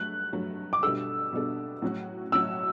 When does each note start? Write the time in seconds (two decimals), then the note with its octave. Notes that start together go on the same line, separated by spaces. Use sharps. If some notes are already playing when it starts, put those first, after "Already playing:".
Already playing: G2 F#3 A3 F#6
0.33 G2 F#3 A3
0.73 D6
0.83 B2 G3 B3 D4 A4 E6
1.33 B2 G3 B3 D4 A4
1.82 A2 F#3 C#4 F#4
2.32 A2 F#3 C#4 F#4 E6